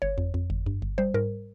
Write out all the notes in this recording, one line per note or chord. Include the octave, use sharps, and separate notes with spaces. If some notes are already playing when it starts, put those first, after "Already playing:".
G1 C#5
F2
F2
G1
G2
G1
G3 C5
G#2 A#4